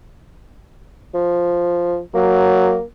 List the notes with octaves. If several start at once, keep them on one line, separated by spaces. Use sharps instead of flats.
F3
F#3 A#3